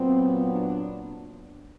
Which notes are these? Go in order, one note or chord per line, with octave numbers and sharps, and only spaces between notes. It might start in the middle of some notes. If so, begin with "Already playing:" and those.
Already playing: A#2 F#3 B3 C4
D4